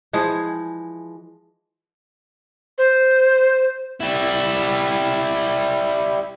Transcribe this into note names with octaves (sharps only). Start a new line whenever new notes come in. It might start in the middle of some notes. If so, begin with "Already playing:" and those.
E3 F3 G#3 G#4
C5
G3 E4